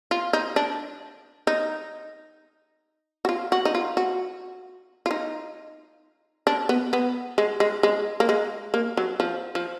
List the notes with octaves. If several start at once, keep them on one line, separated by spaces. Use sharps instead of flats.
F4
D#4
D4
D#4
F#4
F4
F#4
D#4
F4
F#4
F4
D#4
D4
B3
B3
G#3
G#3
G#3
A#3
G#3
A#3
F#3
F3
F3